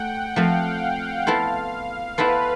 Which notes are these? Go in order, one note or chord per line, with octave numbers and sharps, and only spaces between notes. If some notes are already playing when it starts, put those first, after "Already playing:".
Already playing: A3 F#5 G5
F3 A3 C4 F5
B3 E4 A4 C5
B3 E4 A4 B4 C5